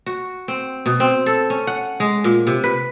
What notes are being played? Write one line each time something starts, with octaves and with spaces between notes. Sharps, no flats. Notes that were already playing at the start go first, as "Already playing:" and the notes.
F#4
C4
B2
C4
A4
C#4
F#5
G#3
A#2
C3
B4